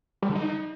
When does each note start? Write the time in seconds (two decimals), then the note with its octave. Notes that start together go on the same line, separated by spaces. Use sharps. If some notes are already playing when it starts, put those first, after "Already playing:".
0.23 G3
0.29 D3
0.35 D#4